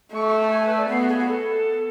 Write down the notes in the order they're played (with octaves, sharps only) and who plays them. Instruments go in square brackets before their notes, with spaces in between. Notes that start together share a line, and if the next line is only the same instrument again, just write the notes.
[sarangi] A3 [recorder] C#6
[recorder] C#6
A5
G#5
B4
D5
[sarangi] B3 [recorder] F5
[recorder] F#4
G#4
F#4
A4